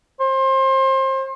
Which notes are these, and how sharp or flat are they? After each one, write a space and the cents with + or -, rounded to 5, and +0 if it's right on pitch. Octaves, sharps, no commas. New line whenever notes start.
C5 +30